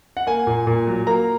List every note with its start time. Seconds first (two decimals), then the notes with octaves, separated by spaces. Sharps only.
0.17 F#5
0.27 A#3 G#5
0.47 A#2
0.67 A#2
0.87 F#3
1.07 A#3 A#5